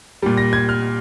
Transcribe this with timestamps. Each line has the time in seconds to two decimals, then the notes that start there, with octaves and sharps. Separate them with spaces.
0.22 A#2 G3
0.37 A#6
0.53 G#6
0.69 F6